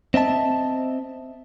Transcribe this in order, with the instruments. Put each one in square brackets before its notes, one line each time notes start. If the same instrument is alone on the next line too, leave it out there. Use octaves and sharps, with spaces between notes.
[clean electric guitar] C4 D#5 E5 A5